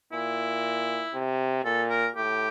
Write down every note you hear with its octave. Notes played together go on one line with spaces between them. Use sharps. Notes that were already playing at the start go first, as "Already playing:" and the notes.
A#2 E4
C3
A#2 A4
A#4
A2 G4